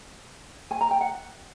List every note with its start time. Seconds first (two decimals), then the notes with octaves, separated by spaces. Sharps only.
0.71 G#5
0.81 A#5
0.91 G5
1.01 F#5